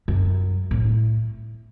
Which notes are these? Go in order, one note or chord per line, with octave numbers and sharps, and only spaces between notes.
F#2
A2